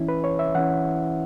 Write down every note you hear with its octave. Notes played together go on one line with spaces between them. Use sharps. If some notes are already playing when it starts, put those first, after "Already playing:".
Already playing: E3 C#4 E4
B4
C#5
E5
E3 C#4 E4 F#5